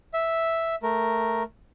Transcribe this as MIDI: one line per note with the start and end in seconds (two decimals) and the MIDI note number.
0.14 0.75 76
0.83 1.43 57
0.83 1.43 70